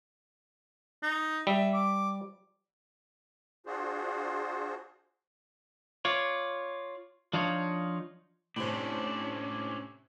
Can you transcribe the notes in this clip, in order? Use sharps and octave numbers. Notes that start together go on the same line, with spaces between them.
D#4
G3 E5
D6
D4 F4 F#4 G#4 C5
F4 C#5 D5
F3 D4 D#4 F4 C#5
A2 C3 C#4 D4 C5